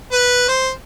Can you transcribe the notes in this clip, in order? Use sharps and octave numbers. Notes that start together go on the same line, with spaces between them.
B4
C5